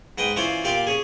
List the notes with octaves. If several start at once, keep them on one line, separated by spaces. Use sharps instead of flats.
G#2 B4 D#5 G5
E3 C#4 F4 C5 D5
A#2 F4 G4 D5 F5
C#4 G#4